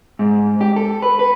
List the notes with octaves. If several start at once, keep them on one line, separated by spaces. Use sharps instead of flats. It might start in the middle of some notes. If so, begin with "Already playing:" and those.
G#2
G4
A4
B4
B4